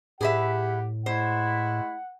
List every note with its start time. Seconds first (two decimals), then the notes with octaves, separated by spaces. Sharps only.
0.21 A2 G4 G#4 B4 E5 F#5
1.06 G#3 A3 E4 C5 F#5